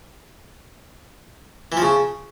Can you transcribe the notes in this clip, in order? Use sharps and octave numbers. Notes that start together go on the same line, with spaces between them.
E3
F3
C#3